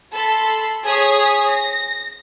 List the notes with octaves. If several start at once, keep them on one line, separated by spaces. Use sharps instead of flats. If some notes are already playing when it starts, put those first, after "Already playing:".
A4 B5 C6
G#4 C#5 D#6 B6
A#6